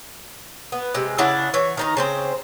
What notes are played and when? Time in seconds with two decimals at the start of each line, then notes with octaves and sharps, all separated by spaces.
0.72 B3
0.94 C3 G#3
1.18 C#3 D4 E4 F#5
1.54 E3 C#5
1.77 D#3 D#4 A#5
1.97 C#3 C4 C5